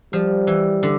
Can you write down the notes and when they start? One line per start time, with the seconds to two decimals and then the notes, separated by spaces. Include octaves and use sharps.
0.13 F3 G3
0.47 E3
0.83 D3